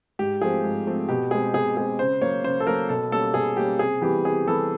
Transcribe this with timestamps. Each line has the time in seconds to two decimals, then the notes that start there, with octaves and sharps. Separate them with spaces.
0.19 G#2 G4
0.42 F3 A3 C4 G#4
0.64 G#2
0.87 F3 A3 C4
1.09 B2 G4
1.31 G#3 C4 G#4
1.54 B2 G#4
1.77 G#3 C4 G#4
1.99 C#3 C5
2.22 F#3 A#3 C#5
2.44 C#3 C5
2.60 A4
2.67 F#3 A#3 A#4
2.89 B2 A4
3.12 G3 A#3 C#4 A4
3.34 B2 G#4
3.57 G3 A#3 C#4 G4
3.79 C3 G#4
4.02 E3 G3 B3 G4
4.25 C3 G#4
4.47 E3 G3 B3 A4